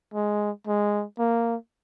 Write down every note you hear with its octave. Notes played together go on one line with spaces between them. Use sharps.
G#3
G#3
A#3